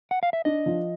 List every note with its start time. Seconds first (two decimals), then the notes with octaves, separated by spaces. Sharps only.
0.11 F#5
0.23 F5
0.33 E5
0.45 D4 D#5
0.66 F3